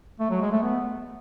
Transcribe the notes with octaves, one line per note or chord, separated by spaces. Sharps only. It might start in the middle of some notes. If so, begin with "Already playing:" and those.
A3
F#3
G#3
A3
B3